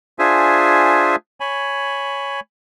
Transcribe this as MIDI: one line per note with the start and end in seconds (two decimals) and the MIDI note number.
0.19 1.16 62
0.19 1.16 65
0.19 1.16 68
0.19 1.16 72
0.19 1.16 76
0.19 1.16 80
1.40 2.40 73
1.40 2.40 80
1.40 2.40 83